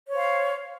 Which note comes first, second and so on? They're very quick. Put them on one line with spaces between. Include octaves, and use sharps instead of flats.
C#5 C5 F5